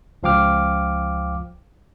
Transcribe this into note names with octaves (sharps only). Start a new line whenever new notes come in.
C#2 F3 F5 G5 D6 F6